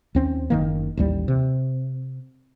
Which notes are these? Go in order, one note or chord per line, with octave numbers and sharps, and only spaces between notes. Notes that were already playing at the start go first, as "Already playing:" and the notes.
D#2 C4 C#4
F#1 D#3 A#3
A1 D#2 G3
C3